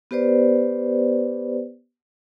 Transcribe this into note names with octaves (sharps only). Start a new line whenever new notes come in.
B3 G4 B4 C5 D5